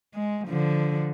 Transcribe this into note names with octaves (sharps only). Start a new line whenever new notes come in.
G#3
D3 F3